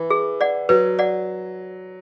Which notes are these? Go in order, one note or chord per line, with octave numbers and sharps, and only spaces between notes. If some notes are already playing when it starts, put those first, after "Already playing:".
Already playing: E3
G#4
D5 F#5
F#3 B4
D5 F#5